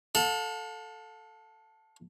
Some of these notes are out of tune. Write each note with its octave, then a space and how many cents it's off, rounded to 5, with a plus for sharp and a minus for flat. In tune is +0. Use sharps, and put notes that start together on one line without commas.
A4 +0 F5 +45